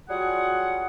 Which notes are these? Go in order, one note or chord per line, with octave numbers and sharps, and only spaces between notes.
F#3 G3 F4 F#4 G#4 F#5